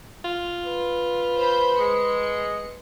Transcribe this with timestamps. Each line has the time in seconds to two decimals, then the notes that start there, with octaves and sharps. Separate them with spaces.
0.24 F4
0.65 B4
1.36 C5 B5 G6
1.79 G#3 C#7